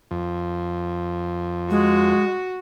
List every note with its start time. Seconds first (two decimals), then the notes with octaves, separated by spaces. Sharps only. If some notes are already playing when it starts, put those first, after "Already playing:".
0.11 F2
1.70 G#3 F#4